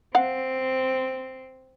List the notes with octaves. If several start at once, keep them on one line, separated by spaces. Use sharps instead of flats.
C4 F5 F#5